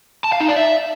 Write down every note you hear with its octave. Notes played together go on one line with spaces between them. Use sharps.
A5
F5
D#4
D5
E5